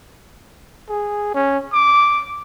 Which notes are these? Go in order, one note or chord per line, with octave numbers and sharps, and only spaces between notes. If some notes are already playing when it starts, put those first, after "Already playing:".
G#4
C#4
D6